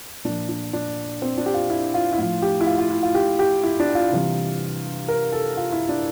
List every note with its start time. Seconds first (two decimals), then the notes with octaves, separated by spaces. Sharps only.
0.25 A#2 F3 D4
0.49 D4
0.73 D4
1.22 C4
1.38 D4
1.46 G4
1.54 F4
1.70 E4
1.94 F4
2.13 E4
2.18 A2 F3 F4
2.42 G4
2.61 E4
2.66 F4
2.78 F4
2.91 E4
3.03 F4
3.15 G4
3.39 G4
3.63 E4
3.80 D4
3.95 F4
4.12 C3 E3 G3
5.08 A#4
5.32 A4
5.57 F4
5.72 E4
5.89 D4